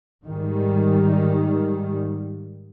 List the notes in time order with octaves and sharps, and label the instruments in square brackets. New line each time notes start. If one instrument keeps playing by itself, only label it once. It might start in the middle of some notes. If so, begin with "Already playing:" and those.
[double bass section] G#2 D#3 G3